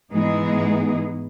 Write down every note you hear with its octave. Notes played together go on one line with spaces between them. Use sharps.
G#2 E3 G#3 B3 D#4 G#4